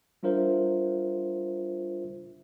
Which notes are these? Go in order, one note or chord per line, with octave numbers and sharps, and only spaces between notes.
G3 D4 F4 A#4 C5 E5